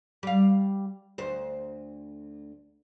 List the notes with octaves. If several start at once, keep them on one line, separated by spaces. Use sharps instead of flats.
G3 F5
D2 C5